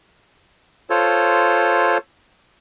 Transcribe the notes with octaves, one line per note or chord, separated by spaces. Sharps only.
F4 A4 C5 C#5